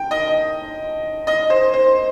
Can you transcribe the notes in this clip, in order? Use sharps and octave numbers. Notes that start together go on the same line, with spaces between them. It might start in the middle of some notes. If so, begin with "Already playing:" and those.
Already playing: G5
D#5
D#5
C5
C5